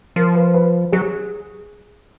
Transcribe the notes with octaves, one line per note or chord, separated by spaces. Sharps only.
F3 A#4
B4
B4
F#3 G#4